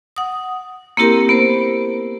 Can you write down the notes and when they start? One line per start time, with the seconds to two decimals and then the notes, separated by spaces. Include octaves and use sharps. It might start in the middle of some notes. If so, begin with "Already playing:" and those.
0.16 F#5 D#6
0.97 A#3 C4 E4 G4 A#4
1.29 B3 C5